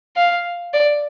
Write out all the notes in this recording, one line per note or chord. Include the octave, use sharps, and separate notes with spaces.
F5
D5